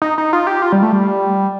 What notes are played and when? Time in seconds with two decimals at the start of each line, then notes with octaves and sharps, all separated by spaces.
0.02 D#4
0.18 D#4
0.33 F4
0.47 G4
0.62 F4
0.72 G3
0.83 A3
0.92 G3